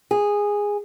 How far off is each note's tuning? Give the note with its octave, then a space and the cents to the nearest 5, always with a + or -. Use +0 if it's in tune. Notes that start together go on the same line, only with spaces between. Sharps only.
G#4 -10